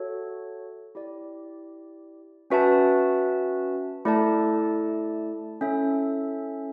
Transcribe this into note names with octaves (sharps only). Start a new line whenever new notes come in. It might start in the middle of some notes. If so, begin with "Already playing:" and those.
Already playing: F#4 A4 C#5 E5
E4 G4 D5
C#4 F#4 B4 E5 A5
A3 E4 A4 D5 A5
C#4 E4 A4 E5